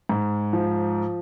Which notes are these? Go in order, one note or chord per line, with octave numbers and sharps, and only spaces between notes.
G#2
F3